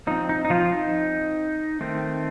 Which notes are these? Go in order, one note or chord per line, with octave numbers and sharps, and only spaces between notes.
F3 C4 D#4
D#4
D#4
F3 F4
D#4
D#3 A3 C4